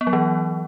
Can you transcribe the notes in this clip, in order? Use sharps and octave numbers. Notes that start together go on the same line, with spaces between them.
B3
F#3
E3